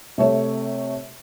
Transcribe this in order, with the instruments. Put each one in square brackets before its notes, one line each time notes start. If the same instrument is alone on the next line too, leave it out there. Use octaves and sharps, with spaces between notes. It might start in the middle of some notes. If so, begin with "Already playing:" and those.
[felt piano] C3 A3 C#5